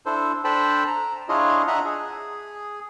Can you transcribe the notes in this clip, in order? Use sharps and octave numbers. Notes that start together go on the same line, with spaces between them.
D4 E4 A4 C5
D4 A4 C5 G5 A5 B5
A#5
D4 E4 F4 G#4 C#5 D#5
D4 D#5 E5 F#5 A#5
G#4